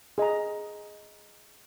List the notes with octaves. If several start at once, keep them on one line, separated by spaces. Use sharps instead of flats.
G#4 D#5 A#5